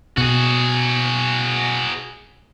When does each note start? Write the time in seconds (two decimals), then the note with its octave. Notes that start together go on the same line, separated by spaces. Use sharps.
0.18 B2 F#4 G#4